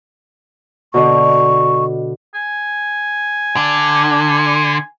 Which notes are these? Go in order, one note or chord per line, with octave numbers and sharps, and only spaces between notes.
B2 D3 D#5 C#6
G#5
D3